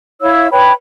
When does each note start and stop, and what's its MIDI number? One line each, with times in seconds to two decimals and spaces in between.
0.21 0.48 64
0.21 0.48 73
0.21 0.48 77
0.21 0.48 88
0.51 0.72 71
0.51 0.72 73
0.51 0.72 79
0.51 0.72 83